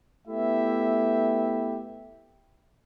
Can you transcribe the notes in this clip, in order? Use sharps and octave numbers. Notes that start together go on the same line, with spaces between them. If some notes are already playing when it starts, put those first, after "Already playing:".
A3 B3 E4 G4 E5